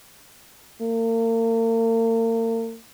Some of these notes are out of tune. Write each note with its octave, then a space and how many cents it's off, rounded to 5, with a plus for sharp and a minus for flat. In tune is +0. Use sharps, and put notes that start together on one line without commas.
A#3 -40